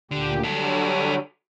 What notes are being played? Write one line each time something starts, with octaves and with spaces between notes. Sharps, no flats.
D2 A#2 D3 G4
D3 F#3 G3 F#4 A4